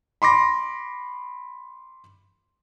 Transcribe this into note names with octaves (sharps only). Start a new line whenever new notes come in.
B5 C6 D6 A#6